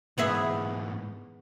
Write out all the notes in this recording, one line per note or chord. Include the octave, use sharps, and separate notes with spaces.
G#2 E3 B3 G#4 E5